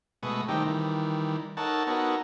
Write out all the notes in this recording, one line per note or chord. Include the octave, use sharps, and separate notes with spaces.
B2 G#3 A3 B4 C#6 D#6
D#3 G3 A3 C4 D#4 G4
D#3 E3 G3
D#4 A4 A#4 C#5 F#5 A5
B3 D#4 F#4 A4 A#4 C#5